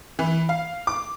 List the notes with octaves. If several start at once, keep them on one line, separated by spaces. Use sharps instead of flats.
E3
F5
D6